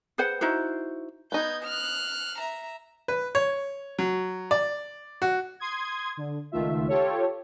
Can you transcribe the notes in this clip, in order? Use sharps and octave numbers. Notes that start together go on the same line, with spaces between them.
G#4 B4 C5 F#5
D#4 E4 F#4 C5
B3 D#4 G6 G#6
F6 F#6
E5 A#5
B4
C#5
F#3
D5
F#4
C6 D#6 G#6
D3
C#2 D#3 A3 F4 E5
F4 G4 A4 C#5